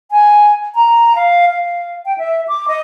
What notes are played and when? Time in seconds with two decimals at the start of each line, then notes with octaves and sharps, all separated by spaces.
0.11 G#5
0.75 A#5
1.16 F5
1.50 F5
2.06 G5
2.18 E5
2.48 D6
2.68 D#5